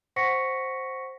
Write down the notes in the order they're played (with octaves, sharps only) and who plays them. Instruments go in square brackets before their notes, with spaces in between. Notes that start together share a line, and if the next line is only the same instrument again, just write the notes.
[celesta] C5 F#5 C#6 A#6 B6 C#7